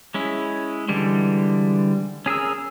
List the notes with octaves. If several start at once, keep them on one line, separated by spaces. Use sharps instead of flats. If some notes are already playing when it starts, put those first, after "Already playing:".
G#3 C#4 E4
D3 E3 G3 G#3
C#4 G#4 A#4 E6